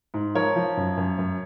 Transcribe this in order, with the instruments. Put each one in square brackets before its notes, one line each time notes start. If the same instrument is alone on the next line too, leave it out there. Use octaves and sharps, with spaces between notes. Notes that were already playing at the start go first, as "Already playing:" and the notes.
[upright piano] G#2
F3 A#4 C#5
F3
F#2
F#2
F#2